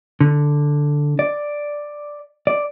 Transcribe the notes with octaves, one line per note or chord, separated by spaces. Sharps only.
D3
D5
D5